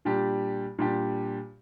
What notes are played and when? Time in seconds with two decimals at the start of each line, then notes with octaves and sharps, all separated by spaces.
0.05 A#2 G3 D4 G4
0.79 A#2 G3 D4 G4